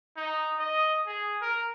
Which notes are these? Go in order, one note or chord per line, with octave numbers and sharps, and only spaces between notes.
D#4
D#5
G#4
A#4